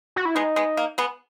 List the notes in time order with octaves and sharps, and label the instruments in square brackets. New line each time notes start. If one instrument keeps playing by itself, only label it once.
[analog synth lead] F#4
E4
[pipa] G#3 B3 [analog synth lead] D#4
[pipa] G#3 B3
A#3
G#3 B3